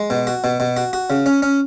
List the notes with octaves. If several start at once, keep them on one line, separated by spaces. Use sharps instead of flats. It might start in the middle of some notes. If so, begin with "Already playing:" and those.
Already playing: G#3
B2
F#4
B2
B2
F#4
F#4
C#3
C#4
C#4